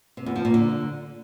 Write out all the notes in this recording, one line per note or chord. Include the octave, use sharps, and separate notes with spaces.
C3
E2
F3
A#2
D3